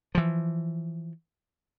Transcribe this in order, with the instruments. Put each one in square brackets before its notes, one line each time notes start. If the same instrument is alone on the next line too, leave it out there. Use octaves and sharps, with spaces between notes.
[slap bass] E3 F3